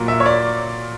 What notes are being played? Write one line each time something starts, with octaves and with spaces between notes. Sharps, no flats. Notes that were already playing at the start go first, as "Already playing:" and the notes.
Already playing: A#2 F#3 A#3
E5
C#5
D5